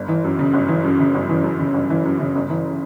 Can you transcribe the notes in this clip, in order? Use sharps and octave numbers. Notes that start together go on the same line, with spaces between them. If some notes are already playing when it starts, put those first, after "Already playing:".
Already playing: G1
E3
F#2
C#3
G1
E3
F#2
C#3
G1
E3
F#2
C#3
G1
E3
F#2
C#3
G1
E3